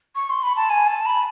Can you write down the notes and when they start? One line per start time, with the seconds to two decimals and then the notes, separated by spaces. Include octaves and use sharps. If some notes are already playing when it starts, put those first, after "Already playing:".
0.16 C#6
0.30 C6
0.43 B5
0.56 A5
0.70 G#5
0.87 A5
1.06 B5